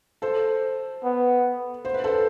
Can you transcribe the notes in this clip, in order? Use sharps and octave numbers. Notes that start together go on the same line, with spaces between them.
A4 C5
B3
C5
B4
A4 C5